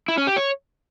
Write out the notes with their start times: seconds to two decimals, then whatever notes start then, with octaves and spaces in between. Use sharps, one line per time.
0.08 E4
0.18 C#4
0.27 G4
0.36 C#5